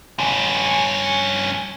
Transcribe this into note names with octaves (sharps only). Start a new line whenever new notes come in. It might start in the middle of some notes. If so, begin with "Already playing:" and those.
G2 C#4